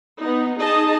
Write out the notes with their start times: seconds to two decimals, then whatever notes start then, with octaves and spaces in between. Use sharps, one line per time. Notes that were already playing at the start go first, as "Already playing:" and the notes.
0.21 B3 D#4
0.60 D#4 G#4 D#5 A5